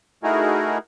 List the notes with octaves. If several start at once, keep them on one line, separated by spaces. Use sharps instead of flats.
A3 D#4 E4 F#4 G#4 A#4